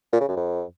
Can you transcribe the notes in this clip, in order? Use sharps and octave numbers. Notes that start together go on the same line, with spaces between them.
A#2
C#3
F#2
F2